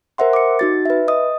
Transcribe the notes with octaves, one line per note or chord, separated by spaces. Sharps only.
A#4 C5 E5 F#5 C6
D6 C#7
D#4 F#4 A6
B4 E5
D#5 D#6